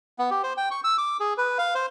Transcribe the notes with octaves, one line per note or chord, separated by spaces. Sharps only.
B3
G4
C5
G5
C#6
E6
D6
G#4
B4
F5
C5